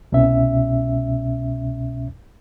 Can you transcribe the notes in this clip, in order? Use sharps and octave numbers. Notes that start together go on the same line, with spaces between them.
C2 B2 C#4 E5